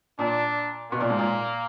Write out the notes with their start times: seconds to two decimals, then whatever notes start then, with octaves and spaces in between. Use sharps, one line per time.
0.19 A#2 D4
0.92 B2 A#3
1.00 A#2
1.10 G#2
1.19 A#2